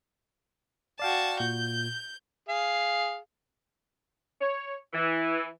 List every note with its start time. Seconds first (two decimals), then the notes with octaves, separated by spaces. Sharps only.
1.00 F#4 D5 F5 G5 A5
1.40 A#2 G6
2.49 G#4 F5
4.41 C#5
4.94 E3